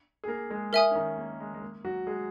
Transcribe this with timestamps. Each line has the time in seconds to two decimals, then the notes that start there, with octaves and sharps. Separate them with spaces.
0.24 G#4
0.28 A#3 A#4
0.50 G#3 G#4
0.73 A#4 E5 G#5 D#6
0.91 C#4
0.95 D#3 D#4
1.18 A#3
1.40 G#3
1.54 G#3
1.62 A#3
1.84 F#3 F#4
2.07 G#3 G#4